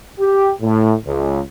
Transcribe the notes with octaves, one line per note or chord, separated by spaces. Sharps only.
G4
A2
C#2